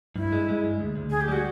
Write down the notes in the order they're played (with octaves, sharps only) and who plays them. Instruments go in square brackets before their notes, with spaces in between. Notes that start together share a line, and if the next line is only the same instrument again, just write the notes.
[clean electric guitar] G2 [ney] E4
[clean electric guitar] G#3
G#3
G2
D2
D2
[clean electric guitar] D2 [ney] G#4
[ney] G4
[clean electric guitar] G3 [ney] F#4